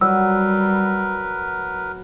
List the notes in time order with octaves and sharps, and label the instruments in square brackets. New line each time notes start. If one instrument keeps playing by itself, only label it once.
[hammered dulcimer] F#3 [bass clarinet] G3 [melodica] A#4 B4 [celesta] E6